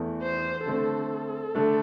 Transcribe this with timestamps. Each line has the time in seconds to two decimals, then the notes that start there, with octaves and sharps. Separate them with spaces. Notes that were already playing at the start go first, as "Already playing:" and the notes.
Already playing: E2 E3 A3
0.23 C5
0.66 D3 A3 C4 A4
1.55 D3 A3 D4